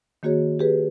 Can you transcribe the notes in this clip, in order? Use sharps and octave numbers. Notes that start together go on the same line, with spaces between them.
D#3 A#3 F#4 G#4 C#5
G4 G#4 B4